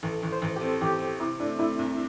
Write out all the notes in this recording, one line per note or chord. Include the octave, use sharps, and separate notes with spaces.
A1 A4
A1
C5
A1
G4
C4 A4
A1 G4
C4
C3 E4
A3 D4
A3 E4
C2